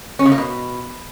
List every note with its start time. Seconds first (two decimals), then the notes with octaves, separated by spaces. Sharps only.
0.19 C#4
0.25 C#3
0.32 A#3
0.38 B2